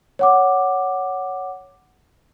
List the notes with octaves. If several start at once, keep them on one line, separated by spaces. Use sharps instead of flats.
C#5 F#5 D6